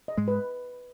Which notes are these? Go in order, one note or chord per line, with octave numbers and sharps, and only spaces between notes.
D#5
G#2 G#3
B4